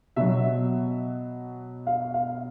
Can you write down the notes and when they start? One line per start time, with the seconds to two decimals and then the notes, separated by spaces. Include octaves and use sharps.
0.16 B2 F#3 E5
1.87 F5
2.14 F5